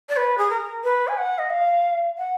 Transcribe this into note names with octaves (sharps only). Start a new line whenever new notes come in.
D5
B4
G#4
A#4
B4
G#5
F#5
D#5
F5
F#5